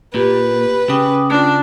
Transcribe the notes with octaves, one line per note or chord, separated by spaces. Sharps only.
A#2 G4 B4
C#3 G5 D6 D#6
C#4 D4 F4